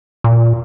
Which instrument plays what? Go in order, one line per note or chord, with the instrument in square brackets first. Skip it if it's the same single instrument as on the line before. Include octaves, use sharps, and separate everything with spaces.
[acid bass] A#2